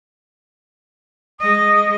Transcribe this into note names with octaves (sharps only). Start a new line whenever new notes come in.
G#3 D#5 D#6